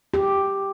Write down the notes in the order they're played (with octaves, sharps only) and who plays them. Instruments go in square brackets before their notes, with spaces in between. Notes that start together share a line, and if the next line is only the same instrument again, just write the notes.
[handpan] G4